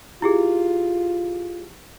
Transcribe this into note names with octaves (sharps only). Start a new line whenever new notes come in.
E4 F4 G4 G#4